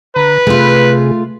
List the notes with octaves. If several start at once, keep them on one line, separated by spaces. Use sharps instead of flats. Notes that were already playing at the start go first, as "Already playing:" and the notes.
D3 B4 A#5
C3 A3 F4 G#4